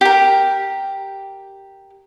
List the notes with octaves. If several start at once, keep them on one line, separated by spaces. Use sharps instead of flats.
G4 A#4